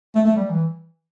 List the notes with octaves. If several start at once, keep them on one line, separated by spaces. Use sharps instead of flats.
A3
A3
G3
E3